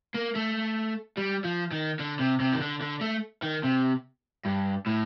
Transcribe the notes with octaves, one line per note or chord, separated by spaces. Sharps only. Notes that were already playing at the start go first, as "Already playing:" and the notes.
A#3
A3
G3
F3
D#3
D3
C3
C3
D#3
D3
D3
A3
D#3
C3
G2
A2